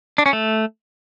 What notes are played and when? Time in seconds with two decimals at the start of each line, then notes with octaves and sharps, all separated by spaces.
0.18 D4
0.26 C#4
0.33 A3